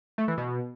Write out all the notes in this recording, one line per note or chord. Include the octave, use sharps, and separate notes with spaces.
A3
E3
B2